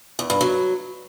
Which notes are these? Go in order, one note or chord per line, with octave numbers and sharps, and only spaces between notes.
E2
G2
F#3